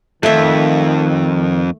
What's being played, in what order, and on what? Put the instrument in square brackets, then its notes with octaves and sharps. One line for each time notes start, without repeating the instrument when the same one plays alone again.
[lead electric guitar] F2 [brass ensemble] D#3 [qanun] A3 E5